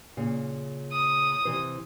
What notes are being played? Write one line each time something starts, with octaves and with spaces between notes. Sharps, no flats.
A#2 C#3 F5
D#6
C3 E3 C5